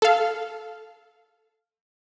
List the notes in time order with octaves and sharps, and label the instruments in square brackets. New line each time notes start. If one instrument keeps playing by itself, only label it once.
[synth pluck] A4 F5